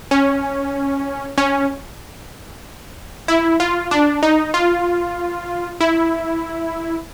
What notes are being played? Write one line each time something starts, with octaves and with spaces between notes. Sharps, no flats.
C#4
C#4
E4
F4
D4
D#4
F4
E4